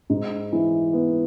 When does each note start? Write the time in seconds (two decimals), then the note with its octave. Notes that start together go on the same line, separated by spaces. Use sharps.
0.10 G#2
0.53 E3
0.93 B3